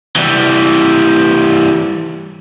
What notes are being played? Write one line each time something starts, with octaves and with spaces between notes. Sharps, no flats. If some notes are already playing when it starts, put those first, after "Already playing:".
E3 G3